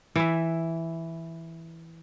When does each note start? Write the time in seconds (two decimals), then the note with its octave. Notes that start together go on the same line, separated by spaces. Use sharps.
0.16 E3 E5